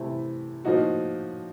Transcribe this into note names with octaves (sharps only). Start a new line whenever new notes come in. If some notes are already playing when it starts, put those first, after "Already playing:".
Already playing: C3 E3 A3 C4 E4
A2 F3 A#3 D#4 F#4